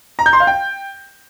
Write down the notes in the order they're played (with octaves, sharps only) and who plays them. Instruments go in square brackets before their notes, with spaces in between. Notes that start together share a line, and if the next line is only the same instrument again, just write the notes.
[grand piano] A#5
G6
C6
F5
G5